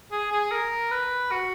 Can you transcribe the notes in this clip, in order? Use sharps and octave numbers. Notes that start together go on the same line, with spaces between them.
G#4
G#4
A#4
B4
F#4